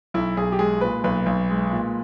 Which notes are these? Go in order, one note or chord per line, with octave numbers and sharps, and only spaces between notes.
B1 E4
B1 G#4
G4
G#3 G#4
A#2 B4
B1 B4
B1
G#3
A#2